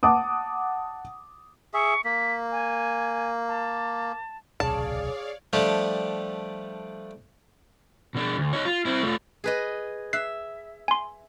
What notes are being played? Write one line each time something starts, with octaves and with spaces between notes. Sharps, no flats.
F#5 A5 D6 D#6
G#4 E5 C#6
A#3 B6
G#5
A5
D1 B1 C3 G#4 C#5 D5 F5 A5
F3 G3 A3 D4 G4
B2 D4
D2
D#4 C#5
F4
C4 E4
A3 F4
G#4 B4 D#5
E5 F#6 C7
G#5 C6